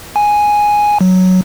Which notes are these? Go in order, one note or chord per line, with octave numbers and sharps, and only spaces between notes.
G#5
F#3